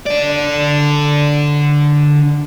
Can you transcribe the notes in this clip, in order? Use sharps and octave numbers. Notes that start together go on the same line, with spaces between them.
D3 D5